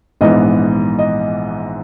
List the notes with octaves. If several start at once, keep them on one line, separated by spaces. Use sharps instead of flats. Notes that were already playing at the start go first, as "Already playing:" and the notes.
A#1 G#2 E3 B3 D#5
D#5